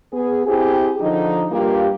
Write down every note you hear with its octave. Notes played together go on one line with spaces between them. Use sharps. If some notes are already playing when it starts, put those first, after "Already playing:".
B3 G#4
C4 E4 G4 G#4
D3 F3 D#4
G2 G3 A#3 F4 G4